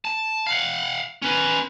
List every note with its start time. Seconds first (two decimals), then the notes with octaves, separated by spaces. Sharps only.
0.05 A5
0.47 F5 F#5
1.22 C#4 B4